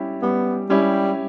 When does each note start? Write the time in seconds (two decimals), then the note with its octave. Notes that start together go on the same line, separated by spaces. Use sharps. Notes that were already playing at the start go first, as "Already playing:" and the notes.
Already playing: G3 C#4 E4 G4
0.22 G3 B3
0.70 G3 C#4 E4 G4